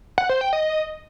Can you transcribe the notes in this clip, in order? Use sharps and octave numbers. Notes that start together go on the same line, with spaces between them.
F#5
C5
G5
D#5